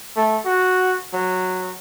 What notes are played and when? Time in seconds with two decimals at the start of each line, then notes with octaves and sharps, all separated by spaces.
0.16 A3
0.45 F#4
1.13 F#3